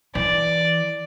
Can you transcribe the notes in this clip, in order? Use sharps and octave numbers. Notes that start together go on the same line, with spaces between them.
E3 D5